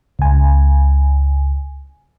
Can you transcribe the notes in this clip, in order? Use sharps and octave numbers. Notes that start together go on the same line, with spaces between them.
C#2 G#5